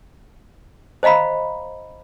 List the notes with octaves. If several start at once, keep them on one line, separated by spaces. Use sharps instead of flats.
C5 D#5 F5 A#5 B5